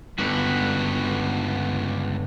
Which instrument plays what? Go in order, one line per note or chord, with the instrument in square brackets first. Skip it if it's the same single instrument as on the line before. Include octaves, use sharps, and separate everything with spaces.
[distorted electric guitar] C#2 F#4 [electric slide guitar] G2 D3 B3